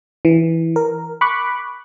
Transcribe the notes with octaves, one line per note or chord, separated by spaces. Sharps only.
E3
A#4
B5 C#6 D6 F#6